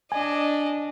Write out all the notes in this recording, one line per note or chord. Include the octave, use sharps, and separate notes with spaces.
D4 D#5 G#5